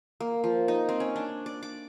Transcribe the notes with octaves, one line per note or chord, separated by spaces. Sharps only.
A#3
F3
D#4
C4
C#4
D4
D5
D6